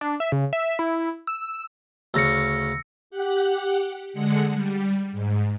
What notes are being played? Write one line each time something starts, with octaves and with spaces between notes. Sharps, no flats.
D4
E5
C#3
E5
E4
E6
D2 C#3 E6 A#6 C#7
G4 F#5 F#6
D3 G#3 F#5 C#7
G3
G#2